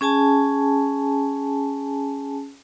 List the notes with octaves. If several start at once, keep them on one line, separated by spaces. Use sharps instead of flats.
C#4 G#4 G#5 A5